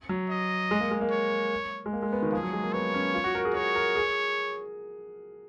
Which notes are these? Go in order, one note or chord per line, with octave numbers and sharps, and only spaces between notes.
F#3
D#5
G#3
A#3
G#3
A#3
C#5
G#3
A#3
G#3
B3
D#3
F3 G#4
F#3
G#3
A#3
B3 C#5
C#4
F4
F#4
A#4
G#4
A#4 C#5
A#4
G#4